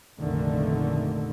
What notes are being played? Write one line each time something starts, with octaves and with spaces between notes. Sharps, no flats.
F1 A#1 D3 D#3 A3